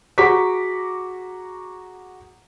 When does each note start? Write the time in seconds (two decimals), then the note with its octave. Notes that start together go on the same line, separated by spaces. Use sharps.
0.18 F#4 G#4 A#5 C#6 D6 B6